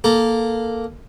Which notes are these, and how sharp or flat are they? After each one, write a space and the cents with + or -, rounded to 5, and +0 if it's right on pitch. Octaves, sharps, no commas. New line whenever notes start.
A#3 +0 A4 +0